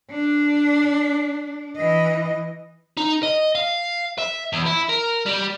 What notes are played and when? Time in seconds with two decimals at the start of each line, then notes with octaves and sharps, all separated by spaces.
0.11 D4
1.77 E3 D#5
2.97 D#4
3.23 D#5
3.55 F5
4.18 E5
4.53 E2
4.66 E4
4.89 A#4
5.26 G3